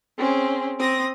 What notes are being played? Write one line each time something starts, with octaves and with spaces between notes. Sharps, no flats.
C4 C#4 G#4
C4 D#6 A#6